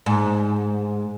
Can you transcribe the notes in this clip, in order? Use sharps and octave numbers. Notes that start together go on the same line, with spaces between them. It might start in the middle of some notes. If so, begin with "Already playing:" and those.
G#2